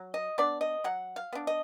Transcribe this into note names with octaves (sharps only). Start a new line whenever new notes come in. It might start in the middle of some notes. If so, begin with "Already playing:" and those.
Already playing: F#3
D#5
B3 D4 D5
D#5
F#3 F#5
F5
B3 D4
D#5